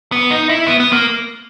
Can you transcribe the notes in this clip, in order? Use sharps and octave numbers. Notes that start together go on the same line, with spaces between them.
B3
D#4
E4
B3
B3
A#3